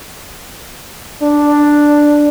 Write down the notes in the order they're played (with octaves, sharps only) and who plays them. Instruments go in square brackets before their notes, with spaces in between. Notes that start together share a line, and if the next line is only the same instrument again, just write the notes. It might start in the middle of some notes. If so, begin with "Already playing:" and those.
[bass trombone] D4